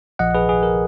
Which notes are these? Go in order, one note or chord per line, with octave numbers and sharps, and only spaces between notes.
A#1 A#2 F3 D#5 F#5
G#4 B4
G#4
A#4